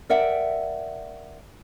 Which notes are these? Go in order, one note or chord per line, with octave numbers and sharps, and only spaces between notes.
A#4 D5 E5 F#5 G5